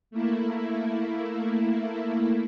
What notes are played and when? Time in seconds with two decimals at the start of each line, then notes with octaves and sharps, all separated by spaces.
0.11 A3 A#3 E4